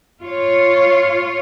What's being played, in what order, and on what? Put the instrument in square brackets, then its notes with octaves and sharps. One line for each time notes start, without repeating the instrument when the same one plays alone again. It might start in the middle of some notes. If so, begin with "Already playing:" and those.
[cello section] F4 C#5